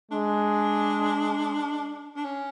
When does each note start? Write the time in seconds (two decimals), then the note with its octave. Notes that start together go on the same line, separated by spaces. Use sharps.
0.11 G#3 D4
2.16 D4
2.25 C#4